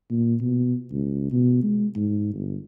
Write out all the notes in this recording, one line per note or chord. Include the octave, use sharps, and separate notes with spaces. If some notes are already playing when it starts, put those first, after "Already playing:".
A#2
B2
C#2
B2
G#3
G#2
G1